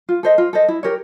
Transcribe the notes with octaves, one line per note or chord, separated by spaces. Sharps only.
F4
A4 C5 D#5
F4
A4 C5 D#5
E4
G4 A#4 C#5